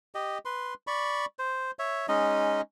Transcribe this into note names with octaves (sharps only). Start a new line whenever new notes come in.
G4 D#5
B4 C6
D5 B5 C#6
C5
C#5 E5
G#3 C#4 D#4 D#5